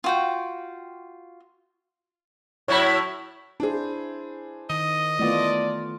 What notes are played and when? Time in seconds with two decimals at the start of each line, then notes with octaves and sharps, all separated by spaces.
0.04 F4 F#4 G5
2.68 A2 F#3 E4 C#5 B5
3.60 D4 E4 G#4 C5
4.70 D#3 D#5
5.19 E3 A3 B3 F4 D5